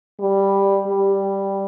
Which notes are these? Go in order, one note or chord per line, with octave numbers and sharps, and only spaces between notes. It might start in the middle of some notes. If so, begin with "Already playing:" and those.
G3
G3